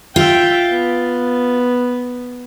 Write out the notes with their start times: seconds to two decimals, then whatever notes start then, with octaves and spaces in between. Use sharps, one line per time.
0.16 F4 E5 G5
0.70 B3